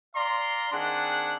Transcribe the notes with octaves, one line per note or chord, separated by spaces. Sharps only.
D5 F5 A#5 C6
D#3 C4 D4 G#4 F#5